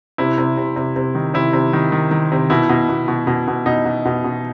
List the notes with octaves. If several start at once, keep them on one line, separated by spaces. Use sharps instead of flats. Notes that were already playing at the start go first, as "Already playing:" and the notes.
C3 E4
C3
C3
C3
C3
D#3
C3 E4
C3
D#3
D#3
D#3
C3
B2 E4
B2
B2
B2
B2
B2
B2 D#4
B2
B2
B2